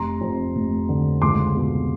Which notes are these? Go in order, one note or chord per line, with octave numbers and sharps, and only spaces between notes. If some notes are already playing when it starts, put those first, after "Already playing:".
Already playing: F1 A#5 C6
F2
F1
D3
C#2 C6 D6
B2